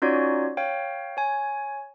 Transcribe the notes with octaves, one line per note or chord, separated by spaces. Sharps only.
C#4 D#4 F4 F#4 C#5 D5
C#5 F5 G5
C#5 G#5